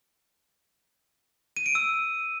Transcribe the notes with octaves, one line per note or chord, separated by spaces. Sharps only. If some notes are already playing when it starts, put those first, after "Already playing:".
D#7
D7
E6